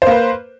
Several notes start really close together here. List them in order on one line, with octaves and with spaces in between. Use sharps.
C5 A#3 B4